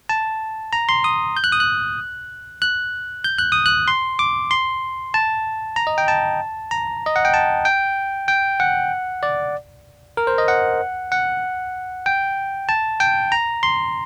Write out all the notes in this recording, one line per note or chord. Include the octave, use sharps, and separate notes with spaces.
A5
A#5
C6
D#6
G6
F#6
D#6
F#6
F#6
G6
F#6
D#6
F#6
C6
D6
C6
A5
A#5
D#5
G5
A5
A#5
D#5
F#5
G5
A5
G5
G5
F#5
D5
A#4
C5
D#5
F#5
F#5
G5
A5
G5
A#5
C6